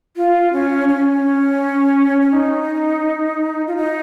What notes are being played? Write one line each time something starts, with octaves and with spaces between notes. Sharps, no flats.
F4
C#4
C#4
C#4
C#4
D#4
F4
D#4